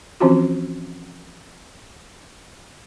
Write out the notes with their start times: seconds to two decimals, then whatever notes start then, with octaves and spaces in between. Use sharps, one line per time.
0.20 E3 F3 C4 C#4 F4 F#4